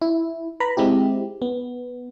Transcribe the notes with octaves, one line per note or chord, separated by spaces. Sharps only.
E4
B4 A#5 B5
G#3 C4 E4 G4
B3